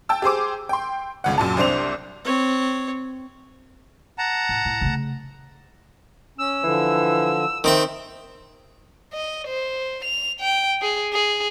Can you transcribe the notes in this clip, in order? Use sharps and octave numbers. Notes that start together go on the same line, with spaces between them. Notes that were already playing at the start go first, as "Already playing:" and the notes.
G5 A5 E6
G4 G#4 C5 D6
G5 C6
G1 C#2 F#5
F#2 A#2 A5
C2 C4 D4 C5 F7
C4 C#5
F#5 A5 A#5
A2
A2
C#3 A3
C#4 E6
D3 E3 F3
D#3 C4 E5
D#5
C5
F7
G5
G#4
G#4